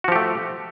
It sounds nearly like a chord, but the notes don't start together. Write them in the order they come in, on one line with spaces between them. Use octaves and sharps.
F#4 F3 G4 A3